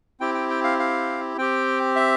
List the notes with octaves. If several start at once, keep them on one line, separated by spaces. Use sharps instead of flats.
C4 E4 G4 G5
G5
G5
F5
F5
C4 G4 G5
E5